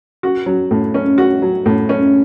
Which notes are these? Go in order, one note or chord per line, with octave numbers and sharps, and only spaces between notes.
F#4
F#3
A2
C#4
F#4
F#3
A2
C#4